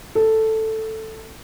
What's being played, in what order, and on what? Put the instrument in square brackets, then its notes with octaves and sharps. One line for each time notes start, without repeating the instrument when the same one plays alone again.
[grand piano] A4